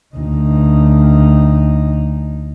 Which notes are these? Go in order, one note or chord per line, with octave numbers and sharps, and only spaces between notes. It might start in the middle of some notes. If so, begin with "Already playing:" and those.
D2 D#4